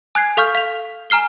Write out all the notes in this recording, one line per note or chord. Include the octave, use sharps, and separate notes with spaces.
G#5 F#6 G#6 C7
A4 F5 C#6 F6 G6
F5 F7
G#5 A#5 F6 C7 G7